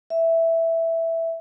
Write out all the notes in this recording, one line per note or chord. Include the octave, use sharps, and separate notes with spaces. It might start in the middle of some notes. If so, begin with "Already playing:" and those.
E5